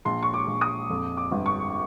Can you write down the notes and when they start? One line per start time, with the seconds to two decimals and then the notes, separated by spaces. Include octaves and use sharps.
0.05 A#1 C6
0.22 C#6
0.34 D6
0.47 A#1
0.61 D#6
0.90 F2
1.17 D6
1.31 G1
1.46 C#6